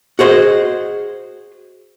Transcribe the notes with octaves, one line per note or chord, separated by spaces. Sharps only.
F#4 G#4 C5 D#5